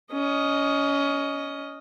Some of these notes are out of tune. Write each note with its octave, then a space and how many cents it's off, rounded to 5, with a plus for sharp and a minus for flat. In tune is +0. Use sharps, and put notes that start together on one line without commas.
C#4 +20 D#5 +0